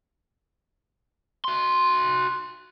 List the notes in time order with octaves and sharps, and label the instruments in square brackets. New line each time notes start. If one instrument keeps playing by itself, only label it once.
[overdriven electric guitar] F#4 C6